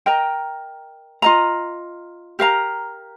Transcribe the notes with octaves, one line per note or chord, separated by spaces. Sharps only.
A#4 D#5 G5 A#5
F4 D#5 A#5
G4 A#4 F5 A#5